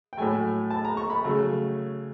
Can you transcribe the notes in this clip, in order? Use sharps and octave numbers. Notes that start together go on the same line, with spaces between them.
G5
A2 F#3 A3 G#5
A5
A#5
C#6
B5
C#3 F#3 A3